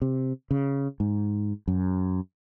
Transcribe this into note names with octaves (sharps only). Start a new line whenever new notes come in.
C3
C#3
G#2
F#2